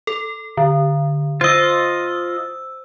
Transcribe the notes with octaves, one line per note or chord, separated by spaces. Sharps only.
A4
D3
F4 C5 D#5 E6